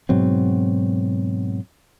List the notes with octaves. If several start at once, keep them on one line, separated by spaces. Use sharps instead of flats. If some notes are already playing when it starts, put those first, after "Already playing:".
G#2 B2 F#3 C4